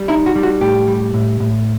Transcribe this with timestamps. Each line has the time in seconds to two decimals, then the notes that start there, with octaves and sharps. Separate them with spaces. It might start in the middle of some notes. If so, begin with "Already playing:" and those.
Already playing: G3
0.08 D#4 E4
0.26 F#4
0.36 G3
0.43 F#4
0.61 A2 G4
0.88 G3
1.14 A2
1.40 A2